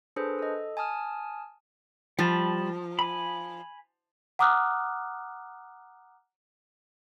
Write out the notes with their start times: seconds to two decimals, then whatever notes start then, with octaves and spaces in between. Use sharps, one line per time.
0.16 D4 G#4 A4 B4 C5
0.39 A4 D#5
0.77 G#5 A5 D#6 F6
2.19 F3 G3 A5 B5
2.99 G#5 B5
4.39 F#5 A#5 D6 D#6 F6 F#6